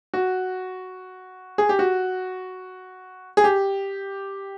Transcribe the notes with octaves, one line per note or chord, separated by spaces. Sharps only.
F#4
G#4
G4
F#4
G#4
G4